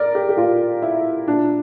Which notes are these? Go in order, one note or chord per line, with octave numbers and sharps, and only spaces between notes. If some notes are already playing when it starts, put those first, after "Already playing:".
Already playing: A#4 D5
G4
G4
A#2 F4
E4
A#2 D4